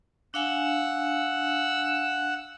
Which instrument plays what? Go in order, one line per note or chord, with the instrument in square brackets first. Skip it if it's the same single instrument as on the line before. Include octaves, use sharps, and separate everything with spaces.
[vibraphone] D4 F5 G#5 [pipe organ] F#5 E6